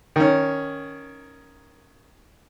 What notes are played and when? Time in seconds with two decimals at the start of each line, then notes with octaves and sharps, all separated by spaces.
0.16 D#3 C#4